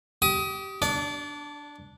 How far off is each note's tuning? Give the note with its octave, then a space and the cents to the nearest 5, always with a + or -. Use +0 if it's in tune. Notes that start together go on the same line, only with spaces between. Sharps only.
G4 -20 D#6 +20
D4 +0 D5 -30